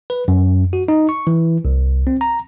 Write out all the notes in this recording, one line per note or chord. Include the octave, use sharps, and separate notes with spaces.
B4
F#2
F#4
D#4
C#6
E3
C2
C4
A#5